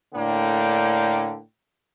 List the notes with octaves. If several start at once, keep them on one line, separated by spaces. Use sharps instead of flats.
A2 D3 A#3 D4 G5